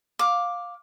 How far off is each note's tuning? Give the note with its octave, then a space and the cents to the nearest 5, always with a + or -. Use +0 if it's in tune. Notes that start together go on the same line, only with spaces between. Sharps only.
F5 +15 D6 +0